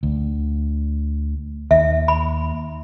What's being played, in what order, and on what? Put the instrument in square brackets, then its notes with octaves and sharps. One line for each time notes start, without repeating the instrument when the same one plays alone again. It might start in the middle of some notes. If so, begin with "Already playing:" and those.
[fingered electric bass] D2
[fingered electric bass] D#2 [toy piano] E5
[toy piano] B5